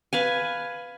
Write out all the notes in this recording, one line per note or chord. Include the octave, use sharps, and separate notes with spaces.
B4 F5 G#5